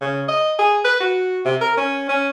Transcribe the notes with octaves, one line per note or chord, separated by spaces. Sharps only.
C#3
D#5
G#4
B4
F#4
C3
A#4
C#4
C#4